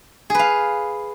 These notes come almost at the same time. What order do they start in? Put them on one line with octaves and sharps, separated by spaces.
G#4 B4 F5